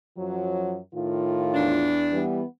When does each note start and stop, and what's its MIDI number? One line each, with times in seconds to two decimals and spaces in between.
0.17 0.79 42
0.17 0.79 53
0.17 0.79 54
0.95 1.93 45
0.95 1.93 51
0.95 1.93 65
1.54 2.20 40
1.54 2.20 62
2.12 2.43 52
2.12 2.43 55
2.12 2.43 59